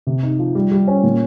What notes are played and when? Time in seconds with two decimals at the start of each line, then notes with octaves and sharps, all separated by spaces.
0.07 C3
0.23 D#4
0.39 F3
0.55 G3
0.71 G3
0.88 C#4
1.03 A#2